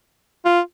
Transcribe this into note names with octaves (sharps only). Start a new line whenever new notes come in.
F4